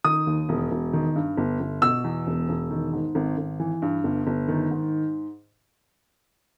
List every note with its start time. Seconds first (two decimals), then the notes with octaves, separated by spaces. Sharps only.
0.04 D#3 D#6
0.27 D#2
0.49 E1
0.71 E1
0.93 D#3
1.16 G2
1.38 G1
1.60 G1
1.82 B2 E6
2.04 E2
2.27 E1
2.49 E1
2.71 D#3
2.93 G#2
3.15 G#1
3.38 G#1
3.60 E3
3.82 G2
4.04 G1
4.27 G1
4.48 D#3
4.71 G#2